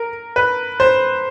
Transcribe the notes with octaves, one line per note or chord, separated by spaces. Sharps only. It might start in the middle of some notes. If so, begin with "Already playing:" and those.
Already playing: A#4
B4
C5